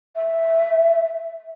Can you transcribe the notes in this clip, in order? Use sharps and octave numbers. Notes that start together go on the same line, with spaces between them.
E5